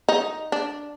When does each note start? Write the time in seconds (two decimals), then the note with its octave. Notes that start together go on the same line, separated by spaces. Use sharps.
0.09 D#4
0.52 D4